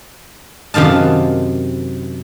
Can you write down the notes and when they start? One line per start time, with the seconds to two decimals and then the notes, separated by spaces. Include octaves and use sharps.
0.74 F#2 C3 D#3 F5 A5